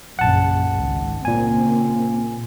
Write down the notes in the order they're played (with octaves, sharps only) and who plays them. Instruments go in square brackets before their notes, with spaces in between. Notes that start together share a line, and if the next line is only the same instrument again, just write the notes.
[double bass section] A#1 F#2 C#3 [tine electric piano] F#5 A5
[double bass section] G#1 C#2
[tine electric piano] A#2 G#5 [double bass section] C#3 A#3 C4